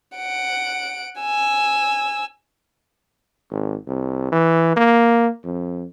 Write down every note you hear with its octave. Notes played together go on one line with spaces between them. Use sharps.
F#5 D7
G#5 E6
G#1
C2
E3
A#3
F2